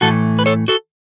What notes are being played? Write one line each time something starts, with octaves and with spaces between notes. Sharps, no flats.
A2 E3 A3 F#4 A4
B4
A4 C#5
F#4 A4